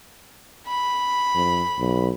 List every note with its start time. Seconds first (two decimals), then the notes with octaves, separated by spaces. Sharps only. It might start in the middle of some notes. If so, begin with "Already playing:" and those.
0.67 B5
1.35 F2
1.78 B1